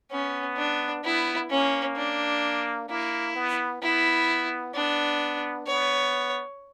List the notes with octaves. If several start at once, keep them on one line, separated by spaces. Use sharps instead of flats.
B3 C#4
D4
B3 E4
A#3 C#4
D4
A#3 E4
B3
B3 E4
B3 D4
B3 C#5